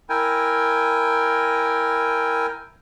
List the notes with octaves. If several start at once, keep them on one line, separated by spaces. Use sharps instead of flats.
E4 A#4 G5 G#5